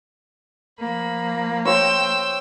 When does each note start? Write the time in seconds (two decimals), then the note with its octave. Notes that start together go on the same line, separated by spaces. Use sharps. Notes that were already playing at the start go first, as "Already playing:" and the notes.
0.80 F3 A#3 B5
1.65 C5 C#5 G5 E6